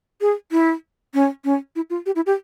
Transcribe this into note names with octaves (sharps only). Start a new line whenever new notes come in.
G#4
E4
C#4
C#4
E4
F4
G4
E4
G4